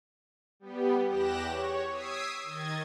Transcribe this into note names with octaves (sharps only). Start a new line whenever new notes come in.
G3 B3 G4
E2 G4 D6 F#6 A#6 E7
C#5
D#6 E6 G#6 B6 C7 D7
D#3 D#5 G#6 A6